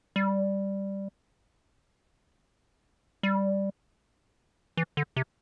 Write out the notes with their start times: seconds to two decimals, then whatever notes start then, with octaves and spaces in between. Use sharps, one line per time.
0.16 G3
3.23 G3
4.77 E3
4.97 D3
5.16 C3